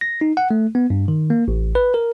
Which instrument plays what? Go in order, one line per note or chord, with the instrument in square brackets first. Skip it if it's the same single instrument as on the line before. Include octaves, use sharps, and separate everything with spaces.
[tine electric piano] A#6
D#4
F#5
A3
B3
G2
D#3
A#3
A1
B4
A#4